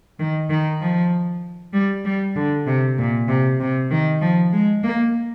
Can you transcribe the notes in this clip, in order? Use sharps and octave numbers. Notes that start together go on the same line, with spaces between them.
D#3
D#3
F3
G3
G3
D3
C3
A#2
C3
C3
D#3
F3
G#3
A#3